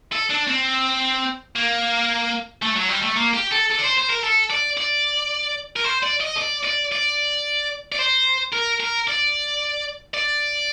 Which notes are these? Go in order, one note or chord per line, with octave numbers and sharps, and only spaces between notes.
A4
D4
C4
A#3
A3
F#3
G3
A3
A#3
G4
A4
A4
D5
C5
C5
A#4
A4
D5
D5
A#4
C5
D5
D#5
D5
D5
D5
D5
C5
A#4
A#4
D5
D5